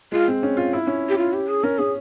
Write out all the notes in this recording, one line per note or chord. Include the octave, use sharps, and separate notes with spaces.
G#3 F4
C4
C#4
F4
E4
C#4
G4
F4
G4
G#4
C#4 A#4
C#4 G#4